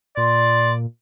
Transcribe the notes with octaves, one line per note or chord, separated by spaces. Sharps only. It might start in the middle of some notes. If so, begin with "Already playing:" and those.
A#2 D5 C6